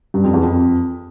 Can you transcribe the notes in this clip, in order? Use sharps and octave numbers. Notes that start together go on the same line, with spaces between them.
G2
F2
E2
F2